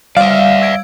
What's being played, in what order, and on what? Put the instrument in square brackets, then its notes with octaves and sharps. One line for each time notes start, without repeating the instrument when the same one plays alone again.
[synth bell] G3 [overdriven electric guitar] D5 E5 [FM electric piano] F5
[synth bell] E6 G#6 D7